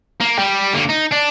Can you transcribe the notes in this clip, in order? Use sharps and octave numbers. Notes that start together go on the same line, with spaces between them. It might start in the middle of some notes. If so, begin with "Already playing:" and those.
A#3
G3
D3 A#3
D#4
D4